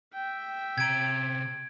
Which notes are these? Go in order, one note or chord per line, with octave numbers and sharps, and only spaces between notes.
E5 G5
C3 A#5 G#6 D7